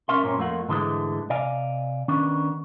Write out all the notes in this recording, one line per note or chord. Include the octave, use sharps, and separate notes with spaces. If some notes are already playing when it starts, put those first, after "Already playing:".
C2 F#3 C#4 A#4 E5 C6
G2 A#2 A#3 C4 C#4
F2 A3 A#3 F4 F#5
G#2 D3 E3 G#3 A3
C3 D5 D#5 F5 G#5
D#3 B3 C#4 D4